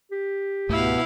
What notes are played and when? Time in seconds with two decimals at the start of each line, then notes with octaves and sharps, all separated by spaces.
0.12 G4
0.69 C#2 G#2 B2 A3 E4 F5